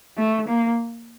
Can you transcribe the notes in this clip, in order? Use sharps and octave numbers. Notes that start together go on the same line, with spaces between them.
A3
A#3